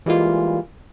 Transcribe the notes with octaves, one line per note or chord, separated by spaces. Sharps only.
E3 G3 G#3 A#3 F4